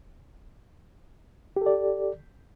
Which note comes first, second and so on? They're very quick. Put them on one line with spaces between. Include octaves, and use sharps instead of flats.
G4 A4 D5